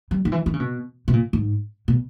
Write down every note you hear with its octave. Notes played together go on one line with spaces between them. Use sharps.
G3
D#3
E3
D#3
C#3
B2
B2
A#2
G#2
B2